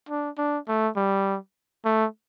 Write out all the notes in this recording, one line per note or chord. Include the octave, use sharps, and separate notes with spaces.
D4
D4
A3
G3
A3